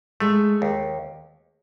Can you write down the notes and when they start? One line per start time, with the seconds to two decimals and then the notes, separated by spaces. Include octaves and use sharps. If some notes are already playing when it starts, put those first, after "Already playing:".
0.20 G#3 A3
0.62 D#2